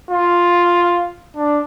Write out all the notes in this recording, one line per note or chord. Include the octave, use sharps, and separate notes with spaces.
F4
D4